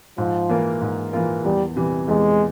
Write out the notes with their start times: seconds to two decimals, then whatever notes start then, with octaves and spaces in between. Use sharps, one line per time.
0.18 G#2 F3
0.49 E3 A#3 F4 A#4
0.81 G#2
1.13 E3 A#3 F4 A#4
1.44 E2 G3
1.76 C3 E3 G3
2.08 E2 G#3